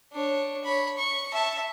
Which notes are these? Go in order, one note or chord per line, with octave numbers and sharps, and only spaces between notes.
D4 C#5
C#5 B5
C#6
E5 A5